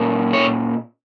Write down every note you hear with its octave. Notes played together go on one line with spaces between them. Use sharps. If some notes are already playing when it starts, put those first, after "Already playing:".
Already playing: A#2 A#3 C#4
C#5